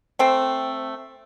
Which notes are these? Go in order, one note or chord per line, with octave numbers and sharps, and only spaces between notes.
A3 C4